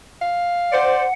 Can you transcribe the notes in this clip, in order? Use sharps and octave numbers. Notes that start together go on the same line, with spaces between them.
F5
C5 D5 F#5